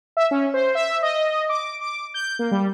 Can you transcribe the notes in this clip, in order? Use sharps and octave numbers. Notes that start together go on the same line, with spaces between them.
E5
C#4
C5
E5
D#5
D6
D6
G6
A#3
G3